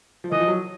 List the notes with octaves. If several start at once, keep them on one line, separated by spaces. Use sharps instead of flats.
F3
E3 D#5
F3
F#3